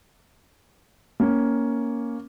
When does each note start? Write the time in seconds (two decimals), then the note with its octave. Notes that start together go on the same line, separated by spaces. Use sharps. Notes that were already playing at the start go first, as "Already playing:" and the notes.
1.20 A#3 C#4